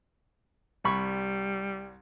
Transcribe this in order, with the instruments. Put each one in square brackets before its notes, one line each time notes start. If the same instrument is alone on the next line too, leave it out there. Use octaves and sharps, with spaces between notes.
[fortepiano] C2 B5 C#6 [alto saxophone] G3